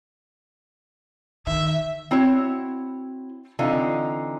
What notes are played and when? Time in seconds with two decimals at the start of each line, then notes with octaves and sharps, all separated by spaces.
1.47 D#3 E5
2.11 C4 E4 F#4 C#5
3.59 D3 E3 C4 D#4 F4